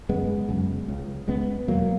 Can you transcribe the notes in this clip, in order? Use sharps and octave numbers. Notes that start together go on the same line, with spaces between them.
F#2 C#3 G#3 B3
F#2 C#3
C#2 C#3
C#2 C#3 G#3 B3
E2 B2 F#3 A#3